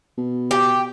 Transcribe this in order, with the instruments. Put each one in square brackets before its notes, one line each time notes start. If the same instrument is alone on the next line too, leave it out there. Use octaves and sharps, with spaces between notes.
[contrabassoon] B2
[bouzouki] G4